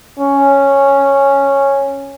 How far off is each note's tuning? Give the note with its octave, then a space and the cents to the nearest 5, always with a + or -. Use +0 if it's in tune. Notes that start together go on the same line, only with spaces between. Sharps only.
C#4 -5